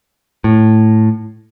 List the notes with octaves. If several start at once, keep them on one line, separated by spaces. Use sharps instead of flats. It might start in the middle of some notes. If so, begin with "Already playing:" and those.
A2